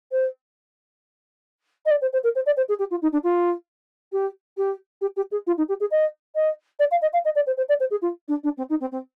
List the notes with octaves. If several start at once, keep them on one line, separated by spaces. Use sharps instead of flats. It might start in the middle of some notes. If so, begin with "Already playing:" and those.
C5
D#5
D5
C5
C5
A#4
C5
D5
C5
G#4
G4
F4
D#4
D4
F4
G4
G4
G4
G4
G#4
F4
D#4
G4
G#4
D#5
D#5
D5
F5
D#5
F5
D#5
D5
C5
C5
D5
C5
G#4
F4
D4
D4
C4
D#4
C4
C4